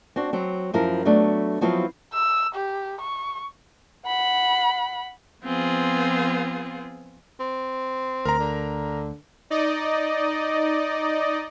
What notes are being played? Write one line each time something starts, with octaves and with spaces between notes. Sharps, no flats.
C4 D4 F#4
F#3 C4
F#2 F3 E4 A#4
F#3 A3 B3 D4
F3 F#3 B3 C4 E4 F4
E6
G4
C#6
F#5 B5
F3 B3 C4 F4 G#4
C4
D2 A#4 A#5
D3
D#4 D5 D#5